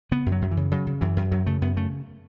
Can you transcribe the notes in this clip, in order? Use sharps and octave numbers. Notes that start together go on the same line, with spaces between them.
C#3 B3
F#2
F#3
F#2
E3
C#3
C#3 F#3
C#3
F#2 E3
F#2
F#2 F#3
C#3 A3
F#2 B3
C#3 A3